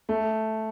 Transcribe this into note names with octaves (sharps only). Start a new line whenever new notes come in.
A3